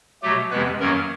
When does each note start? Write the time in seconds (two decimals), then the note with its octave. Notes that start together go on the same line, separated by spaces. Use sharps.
0.22 B2 F#3 A3 G4
0.50 F2 C3 E3 G#3 B3 B4
0.80 F#2 D#3 F#3 A#3 A#4